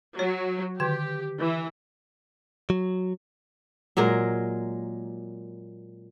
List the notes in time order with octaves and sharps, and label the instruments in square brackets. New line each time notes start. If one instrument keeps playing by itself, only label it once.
[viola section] F#3 [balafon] C#5
[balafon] D3 D#3 G5 [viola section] G4
[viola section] E3
[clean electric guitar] F#3
[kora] A#2 F#3 G#3 A#4